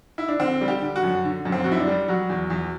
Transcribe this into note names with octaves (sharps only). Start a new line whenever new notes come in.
E4
D4
D3 C4
G3
G4
D3
F#4
F#2
D3
F#2
C4
F#2 F#4
E4
D4
G3
F#3 F#4
E2
E2